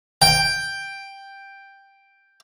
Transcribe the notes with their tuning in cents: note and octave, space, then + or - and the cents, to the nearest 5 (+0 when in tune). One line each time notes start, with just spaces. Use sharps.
G5 +5